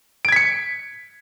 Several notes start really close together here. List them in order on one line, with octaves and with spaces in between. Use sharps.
D7 G#6 B6 C#7